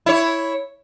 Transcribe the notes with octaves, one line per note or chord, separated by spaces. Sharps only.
E4 C#5